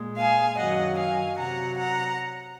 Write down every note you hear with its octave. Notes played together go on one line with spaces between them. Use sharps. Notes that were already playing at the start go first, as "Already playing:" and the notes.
Already playing: A#2 G#3
F5 G#5
F#2 D#3 F#3 D#5 F#5
F5 G#5
C3 F#3 F#5 A#5
F#5 A#5